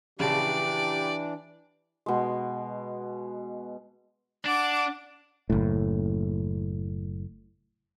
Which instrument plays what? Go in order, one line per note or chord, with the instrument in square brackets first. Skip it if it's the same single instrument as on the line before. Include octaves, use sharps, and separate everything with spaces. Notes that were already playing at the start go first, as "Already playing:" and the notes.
[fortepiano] A#1 C#3 A5 [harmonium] E3 D4 [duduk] G4 [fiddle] D5
[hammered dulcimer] B2 G#3
[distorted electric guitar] D4 [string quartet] F#5 D6
[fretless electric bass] F#1 A2